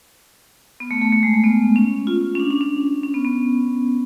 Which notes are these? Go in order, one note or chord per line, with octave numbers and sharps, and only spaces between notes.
B3
A3
A3
A3
G#3
A3
B3
C#4
F4
C#4
D4
D4
C#4
C#4
B3
B3